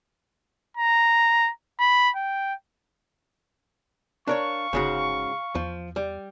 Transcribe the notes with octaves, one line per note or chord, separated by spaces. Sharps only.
A#5
B5
G5
D4 A#4 C#5 F5 C#6
G1 G#2 C#3 F#4
E2 F3
G3